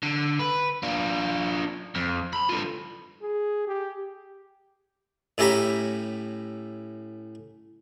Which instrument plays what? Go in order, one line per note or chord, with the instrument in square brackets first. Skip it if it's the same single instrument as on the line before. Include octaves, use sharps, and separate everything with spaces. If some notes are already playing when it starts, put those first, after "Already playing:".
[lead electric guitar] D3
B4
D4 F4
F2
B5 C6
D3 F4
[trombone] G#4
G4
[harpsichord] A2 C#4 E4 G4 A#5 B5